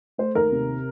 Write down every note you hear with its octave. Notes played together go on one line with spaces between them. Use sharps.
A3 C5
D#2 A#4
C3